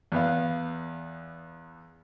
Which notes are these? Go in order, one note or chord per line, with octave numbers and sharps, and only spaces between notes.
E2 B3 F5